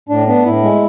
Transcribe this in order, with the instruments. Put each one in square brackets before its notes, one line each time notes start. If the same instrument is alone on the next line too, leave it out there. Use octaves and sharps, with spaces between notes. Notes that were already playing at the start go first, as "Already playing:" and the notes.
[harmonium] A2 D4
B3 D4
A2 E4
G#3